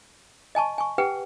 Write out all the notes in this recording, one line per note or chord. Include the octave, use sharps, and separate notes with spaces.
D#5 G#5 A5 C#6
G#5 C#6
G4 B4 F#5 G5